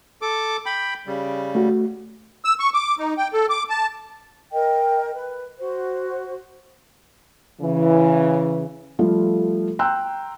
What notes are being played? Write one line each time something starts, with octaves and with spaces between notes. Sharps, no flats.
A4 D6
G5 B5
C#3 G3
A3 F#4
E6
C#6
D6
D#4
G5
A4
D6
A5
A#4 D#5 G5
B4
F#4 C5
C#3 E3
F3 G3 A3 F4 A4
G5 A#5 C6 E6 F#6